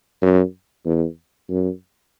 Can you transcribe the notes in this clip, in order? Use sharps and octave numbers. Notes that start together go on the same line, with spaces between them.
F#2
E2
F#2